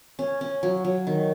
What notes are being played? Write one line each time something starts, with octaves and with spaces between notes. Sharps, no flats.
C#4
C#4
F#3
F#3
D#3